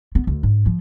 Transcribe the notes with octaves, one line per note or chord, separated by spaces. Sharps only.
B3
D2
G#2
F3